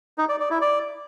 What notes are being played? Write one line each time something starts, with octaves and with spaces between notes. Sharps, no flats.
D#4
D5
D5
E4
D5